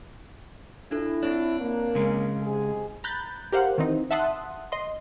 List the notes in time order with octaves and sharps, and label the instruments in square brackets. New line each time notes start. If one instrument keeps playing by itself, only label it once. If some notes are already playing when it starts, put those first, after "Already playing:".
[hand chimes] D4 F4 A4 [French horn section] E4
[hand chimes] C4 C#5 [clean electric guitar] D4
[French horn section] A#3
[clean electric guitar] C#3 G#3
[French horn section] G#2 C3 G#4
[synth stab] A#5 B5 F#6 G6 A6
G4 A#4 C5 F5 F#5
D#3 E3 C4 D#4
E5 F#5 A5 C6 D#6 F#6
D#5 C6